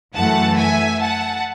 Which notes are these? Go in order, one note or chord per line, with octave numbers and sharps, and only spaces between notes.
F#2 E3 A3 F#5 A5
E5 G#5
F#5 A5